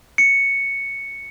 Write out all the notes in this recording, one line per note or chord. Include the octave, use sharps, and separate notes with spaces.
C#7